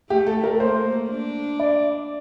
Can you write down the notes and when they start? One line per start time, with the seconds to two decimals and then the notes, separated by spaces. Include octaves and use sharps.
0.10 A3 G4
0.27 A4
0.44 A#4
0.60 A#3 C5
1.09 D4
1.60 D5